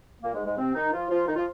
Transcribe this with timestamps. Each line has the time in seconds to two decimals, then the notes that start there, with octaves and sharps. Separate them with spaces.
0.22 A#2 A#3
0.34 G#2 G#3
0.46 G#2 G#3
0.57 C3 C4
0.75 D#3 D#4
0.93 F3 F4
1.10 F3 F4
1.27 D#3 D#4
1.36 F3 F4